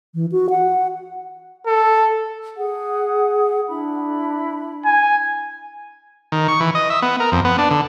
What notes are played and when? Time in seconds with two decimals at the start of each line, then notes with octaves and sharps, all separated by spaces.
0.14 E3
0.32 F#4
0.50 F#5
1.66 A4
2.55 G#4 F#5
3.68 D4 E4 B5
4.85 G#5
6.32 D#3
6.48 C#6
6.60 E3
6.75 D#5
6.90 E5
7.02 B3
7.20 A#4
7.32 F2
7.45 B3
7.58 D4
7.71 D3